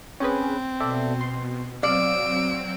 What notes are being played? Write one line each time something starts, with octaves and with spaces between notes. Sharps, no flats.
C4 C#4 G#4 B4
B2 A4 D5 E5
C6
F#3 C4 D5 F5 E6 D7